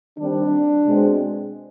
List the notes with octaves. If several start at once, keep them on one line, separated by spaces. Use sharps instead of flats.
D#3 G3 C4 D4
B2 G#3 C4